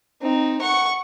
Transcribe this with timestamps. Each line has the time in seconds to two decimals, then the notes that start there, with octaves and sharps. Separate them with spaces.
0.22 C4 D#4
0.61 F#5 C#6